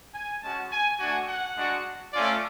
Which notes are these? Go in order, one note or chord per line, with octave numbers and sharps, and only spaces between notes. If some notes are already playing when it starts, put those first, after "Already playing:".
G#5
G#3 C#4 F#4 A5
G#5
A3 D4 F#4 G#5
F#5
G#3 D4 F#4
A3 C#4 F4 D5